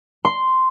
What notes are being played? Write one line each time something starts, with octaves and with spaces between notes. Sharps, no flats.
C6